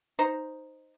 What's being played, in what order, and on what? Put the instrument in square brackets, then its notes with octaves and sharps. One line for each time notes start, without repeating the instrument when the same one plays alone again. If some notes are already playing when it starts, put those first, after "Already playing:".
[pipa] D#4 C5 A#5